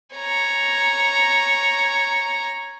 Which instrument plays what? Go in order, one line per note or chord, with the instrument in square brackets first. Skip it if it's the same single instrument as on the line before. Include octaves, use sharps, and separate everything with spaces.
[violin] C#5 A#5